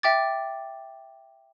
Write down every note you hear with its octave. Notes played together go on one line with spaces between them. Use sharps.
E5 G5 D6 A6